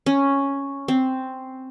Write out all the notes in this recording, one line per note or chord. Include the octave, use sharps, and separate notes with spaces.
C#4
C4